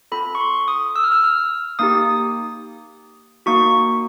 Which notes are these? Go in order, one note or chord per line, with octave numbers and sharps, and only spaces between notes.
C4 F4 A4 B5
C#6
C6
D#6
E6
F6
E6
F6
A#3 D#4 G4 D#6
A#3 D#4 F#4 C#6